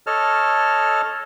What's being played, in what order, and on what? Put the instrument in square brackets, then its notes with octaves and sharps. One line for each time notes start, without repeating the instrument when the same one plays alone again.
[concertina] A4 C#5 D#5 A5 F6